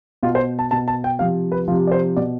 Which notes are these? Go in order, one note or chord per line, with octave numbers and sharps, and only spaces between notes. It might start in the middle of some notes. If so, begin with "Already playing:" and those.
B2 F4
C5
A5
B2 A5
A5
G5
C3 F3 F5
B4
C3 F3 F4
D5
C5
B2 D5